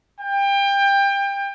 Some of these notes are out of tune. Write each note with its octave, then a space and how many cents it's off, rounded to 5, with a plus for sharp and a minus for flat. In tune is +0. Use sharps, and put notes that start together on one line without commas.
G5 +25